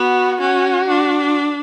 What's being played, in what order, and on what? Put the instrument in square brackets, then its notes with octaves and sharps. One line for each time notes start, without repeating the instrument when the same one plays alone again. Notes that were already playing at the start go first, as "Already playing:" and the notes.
Already playing: [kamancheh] B3 [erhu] F#4
[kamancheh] C#4 [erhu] F#4
[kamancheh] D4